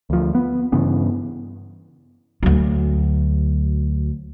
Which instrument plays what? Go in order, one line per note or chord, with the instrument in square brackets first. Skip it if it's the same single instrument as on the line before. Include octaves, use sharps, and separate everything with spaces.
[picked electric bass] D2 F3
B3
G2 C#3 E3 B3
[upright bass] D2 F#3